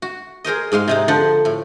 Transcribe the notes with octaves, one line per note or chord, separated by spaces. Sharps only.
F#4
G#4 A#4 C5 D#5
G#2 G#3 F5 C6
C3 G#3 D#4
D3 F3 D4 C5 F#5
A2